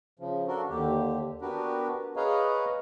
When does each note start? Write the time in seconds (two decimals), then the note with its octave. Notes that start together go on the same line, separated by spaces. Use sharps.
0.19 C#3 F3
0.47 D4 F#4 A4 A#4
0.69 D#2 D3 G4
1.41 B3 D4 F#4 G4 A#4 B4
2.16 G#4 B4 C#5 D#5 F5 A#5